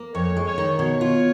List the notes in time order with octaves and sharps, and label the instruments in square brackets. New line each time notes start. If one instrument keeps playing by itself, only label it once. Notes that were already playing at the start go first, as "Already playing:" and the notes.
Already playing: [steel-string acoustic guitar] A#3
[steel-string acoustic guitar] F2 [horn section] C#5
[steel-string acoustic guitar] G#3
[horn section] C#5
[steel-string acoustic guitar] D#3
[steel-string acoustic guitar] B2 [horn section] C#5
[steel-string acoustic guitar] F4